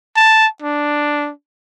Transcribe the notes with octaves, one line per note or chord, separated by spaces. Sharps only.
A5
D4